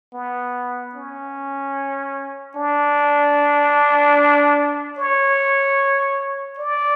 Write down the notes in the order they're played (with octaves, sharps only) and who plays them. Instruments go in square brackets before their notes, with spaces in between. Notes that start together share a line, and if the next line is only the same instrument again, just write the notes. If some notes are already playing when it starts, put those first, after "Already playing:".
[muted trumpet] B3
C#4
D4
C#5
D5